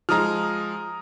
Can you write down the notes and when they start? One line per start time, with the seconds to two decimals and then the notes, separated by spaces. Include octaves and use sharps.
0.09 F3 G#3 A#5 D#6 F6